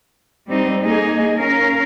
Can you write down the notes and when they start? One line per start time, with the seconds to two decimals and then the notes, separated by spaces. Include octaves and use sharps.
0.47 G3 C4 D#4
0.81 A#3 D#4 G#4 D#5
1.37 C#4 A#4 F5